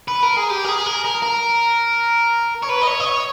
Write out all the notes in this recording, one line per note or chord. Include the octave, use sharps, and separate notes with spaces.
B4
A#4
G#4
G4
A#4
G#4
A#4
A#4
A#4
C#5
B4
D#5
C#5
D#5
C#5